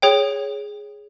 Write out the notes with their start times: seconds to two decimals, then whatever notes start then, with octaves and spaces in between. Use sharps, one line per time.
0.02 G#4 C#5 G5